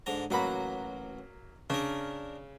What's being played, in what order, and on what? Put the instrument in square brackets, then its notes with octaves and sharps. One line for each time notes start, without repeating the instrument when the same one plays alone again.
[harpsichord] G#2 D3 A#5
[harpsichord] A1 F#4 F#5 [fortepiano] F#3 A#3 B5
[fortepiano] C#3 [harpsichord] D4 A#4